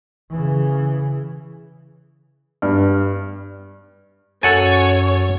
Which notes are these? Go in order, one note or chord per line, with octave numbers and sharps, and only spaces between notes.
C#3 E3
G2
F#2 A4 C#5 F#5 G#5 A6